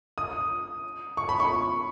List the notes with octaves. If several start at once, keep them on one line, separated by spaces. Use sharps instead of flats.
D#6
C#6
B5
C#6